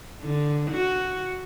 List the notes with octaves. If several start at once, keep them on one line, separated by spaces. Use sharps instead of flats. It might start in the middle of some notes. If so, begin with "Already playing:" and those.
D3
F#4